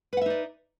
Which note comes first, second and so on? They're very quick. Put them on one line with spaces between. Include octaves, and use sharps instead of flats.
B4 F#5 E5 D#4 D5